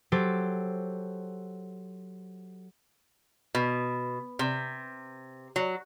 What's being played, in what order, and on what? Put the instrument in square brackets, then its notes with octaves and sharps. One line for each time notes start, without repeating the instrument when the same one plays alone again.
[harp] F#3 G4 A4 C5
[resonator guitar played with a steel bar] B2
C3
F#3